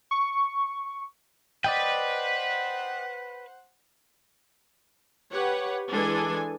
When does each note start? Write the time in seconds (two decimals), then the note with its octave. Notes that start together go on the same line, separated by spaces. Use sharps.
0.11 C#6
1.64 B4 C5 D5 D#5 F#5 G5
5.31 G4 B4 C#5 F#5
5.91 E3 G#3 D4 A4 G#5